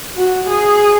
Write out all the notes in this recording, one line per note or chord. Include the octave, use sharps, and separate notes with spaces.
F#4
G#4